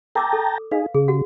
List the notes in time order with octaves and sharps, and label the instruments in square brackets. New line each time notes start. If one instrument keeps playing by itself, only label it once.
[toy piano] A#4 D6 E6 [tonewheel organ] G5 A5 A#5
[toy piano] A4
[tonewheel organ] D#4 G#4 [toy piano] B4 F5
[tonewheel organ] C#3 [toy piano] G#4
[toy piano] F#4 G4 F#5